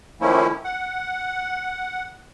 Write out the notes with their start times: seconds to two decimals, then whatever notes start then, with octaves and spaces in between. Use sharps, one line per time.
0.21 D#3 F3 A3 A#3 C#4 E4
0.64 F#5